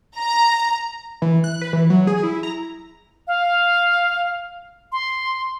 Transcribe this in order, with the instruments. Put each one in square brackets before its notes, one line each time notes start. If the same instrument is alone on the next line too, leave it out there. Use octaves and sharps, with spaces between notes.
[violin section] A#5
[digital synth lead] E3
F#6
B4
E3
F#3
G#4
E4
A#5
[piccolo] F5
C6